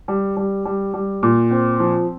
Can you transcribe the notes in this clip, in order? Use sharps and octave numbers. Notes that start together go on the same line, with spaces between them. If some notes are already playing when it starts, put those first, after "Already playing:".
G3
G3
G3
G3
A#2
C4
F3